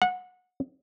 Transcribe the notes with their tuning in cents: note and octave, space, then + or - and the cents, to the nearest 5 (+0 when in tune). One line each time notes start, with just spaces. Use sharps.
F#5 -20